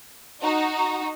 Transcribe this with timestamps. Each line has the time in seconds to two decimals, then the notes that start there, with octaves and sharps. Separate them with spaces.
0.42 D#4 F#4